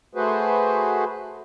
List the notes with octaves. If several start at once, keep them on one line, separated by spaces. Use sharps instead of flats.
A3 F#4 G#4 B4 C5